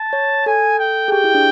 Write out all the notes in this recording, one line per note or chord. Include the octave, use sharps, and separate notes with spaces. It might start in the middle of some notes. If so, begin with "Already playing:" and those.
Already playing: A5
C#5
A4 G#5
G5
G#4
G4 G5
E4
D4